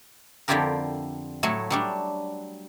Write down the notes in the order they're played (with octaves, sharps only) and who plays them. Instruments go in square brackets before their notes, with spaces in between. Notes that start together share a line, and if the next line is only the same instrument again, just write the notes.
[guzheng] F2 D3 E4 F4 G4 A#4
A2 F#3 A3 E4
F#3 G3 D4